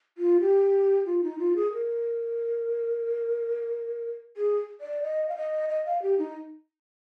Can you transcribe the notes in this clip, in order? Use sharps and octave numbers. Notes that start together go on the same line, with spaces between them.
F4
G4
F4
D#4
F4
G#4
A#4
G#4
D5
D#5
F5
D#5
D#5
F5
G4
D#4